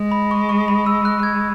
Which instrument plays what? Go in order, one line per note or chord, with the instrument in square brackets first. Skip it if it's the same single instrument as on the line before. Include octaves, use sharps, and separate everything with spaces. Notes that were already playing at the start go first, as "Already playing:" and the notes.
Already playing: [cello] G#3
[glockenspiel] B5
C#6
C#6
B5
E6
F#6
F#6
G#6